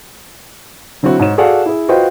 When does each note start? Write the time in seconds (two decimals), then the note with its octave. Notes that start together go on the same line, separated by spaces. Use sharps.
1.03 D3 F#3 C4 E4 F#4
1.19 G#2 C#5 E7
1.38 F#4 G#4 A4 D5 F5 F#5
1.66 E4 G#4
1.88 F4 F#4 B4 C5 D#5 G5